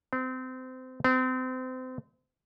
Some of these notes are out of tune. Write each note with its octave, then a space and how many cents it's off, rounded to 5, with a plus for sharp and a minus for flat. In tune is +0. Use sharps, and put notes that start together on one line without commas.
C4 -25
C4 -30